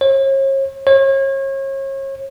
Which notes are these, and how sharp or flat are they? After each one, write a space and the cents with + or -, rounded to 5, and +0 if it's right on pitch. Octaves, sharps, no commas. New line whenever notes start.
C#5 -40
C#5 -35